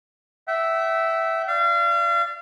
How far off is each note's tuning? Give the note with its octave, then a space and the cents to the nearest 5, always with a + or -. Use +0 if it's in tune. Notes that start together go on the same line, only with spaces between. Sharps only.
E5 +0 G5 -45
D5 +0 F5 -35